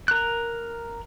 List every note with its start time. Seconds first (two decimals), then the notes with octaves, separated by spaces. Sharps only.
0.08 A#4 F#6